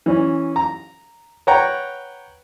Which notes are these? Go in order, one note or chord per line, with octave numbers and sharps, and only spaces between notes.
E3 C#4
A#5
B4 C#5 F#5 G5 A#5